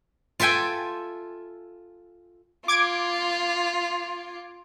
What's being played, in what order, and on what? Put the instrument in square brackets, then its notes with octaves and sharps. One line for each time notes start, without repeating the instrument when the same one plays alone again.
[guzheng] F4 A4 E5 G5 G#5
[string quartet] F4 [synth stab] D6 G#6 D7